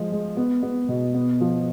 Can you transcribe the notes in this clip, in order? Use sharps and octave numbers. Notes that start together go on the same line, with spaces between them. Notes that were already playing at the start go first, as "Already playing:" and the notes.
Already playing: F3 G#3
G#3
B3
B3
B2
B3
F3